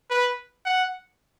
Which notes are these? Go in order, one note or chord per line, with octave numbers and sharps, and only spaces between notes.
B4
F#5